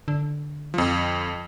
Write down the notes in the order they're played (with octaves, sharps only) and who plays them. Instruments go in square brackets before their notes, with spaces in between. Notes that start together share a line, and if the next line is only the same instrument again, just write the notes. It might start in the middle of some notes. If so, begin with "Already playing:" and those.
[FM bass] D3
[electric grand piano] F2 F3